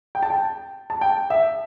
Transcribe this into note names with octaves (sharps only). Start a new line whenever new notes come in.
G5
A5
G5
A5
G5
E5